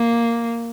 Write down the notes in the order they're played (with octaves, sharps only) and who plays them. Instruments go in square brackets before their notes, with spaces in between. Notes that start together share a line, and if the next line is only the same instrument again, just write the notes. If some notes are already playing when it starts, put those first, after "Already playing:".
Already playing: [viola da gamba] A#3